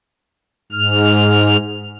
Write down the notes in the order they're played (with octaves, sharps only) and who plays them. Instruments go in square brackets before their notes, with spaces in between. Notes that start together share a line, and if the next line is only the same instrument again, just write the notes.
[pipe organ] G#2 F6